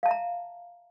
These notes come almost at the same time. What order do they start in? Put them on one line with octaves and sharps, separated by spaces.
F5 A5 E5 A#5